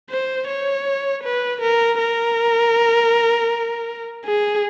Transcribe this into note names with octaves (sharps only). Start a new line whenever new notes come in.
C5
C#5
B4
A#4
A#4
G#4